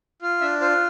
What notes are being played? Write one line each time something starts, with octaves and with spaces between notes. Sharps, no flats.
F4
D4 E5
F4 C5